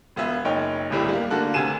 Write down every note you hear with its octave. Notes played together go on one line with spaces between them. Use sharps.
E1 B3 F4 E5
F#1 D#4 C#5 G5
D1 G1 C2 G3 E4
G3 A#3
D3 A3 A#3 F#4 A4 F#6
D2 C3 G#5 D#7 E7